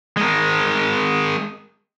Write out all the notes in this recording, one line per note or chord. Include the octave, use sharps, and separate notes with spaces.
G#3 A#4